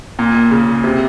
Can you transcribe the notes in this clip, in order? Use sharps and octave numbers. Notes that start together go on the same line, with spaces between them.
A#2
C#3
C3